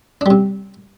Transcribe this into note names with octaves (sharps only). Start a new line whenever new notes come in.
C3 G3 D4